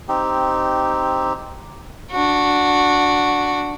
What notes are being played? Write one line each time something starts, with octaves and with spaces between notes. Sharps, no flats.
C4 D#4 G4
D4 F#4